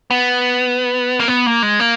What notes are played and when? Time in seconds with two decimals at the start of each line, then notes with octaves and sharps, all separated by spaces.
0.11 B3
1.20 A#3
1.28 B3
1.46 A#3
1.63 G#3
1.80 A#3